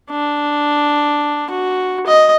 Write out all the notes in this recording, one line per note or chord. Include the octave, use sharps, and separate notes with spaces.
D4
F#4
D#5